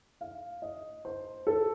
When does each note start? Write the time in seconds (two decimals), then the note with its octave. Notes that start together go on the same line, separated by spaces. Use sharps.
0.21 F5
0.62 D#5
1.05 C5
1.47 A4